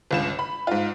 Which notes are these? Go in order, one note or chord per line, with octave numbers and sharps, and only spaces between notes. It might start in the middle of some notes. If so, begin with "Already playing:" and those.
G1 C#2 E7
B5
G#2 F4